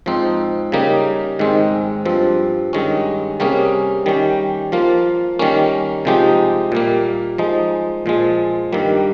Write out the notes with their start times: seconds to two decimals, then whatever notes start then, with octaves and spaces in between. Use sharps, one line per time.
0.06 G#2 F3 C4 D#4
0.72 C#3 G3 A#3 D#4
1.39 G#2 D#3 G#3 C4
2.06 G2 F3 C4
2.73 G2 D#3 G#3 C#4
3.40 C3 G3 A#3 C#4 G#4
4.06 D#3 G3 C#4 G4
4.72 F3 A#3 F4
5.39 D#3 G3 A#3 C#4
6.05 C3 F3 G#3 D#4 G4
6.72 A#2 G3 A#3
7.38 F3 G#3 D#4
8.06 A#2 F3 G#3
8.73 G2 D#3 G3 A#3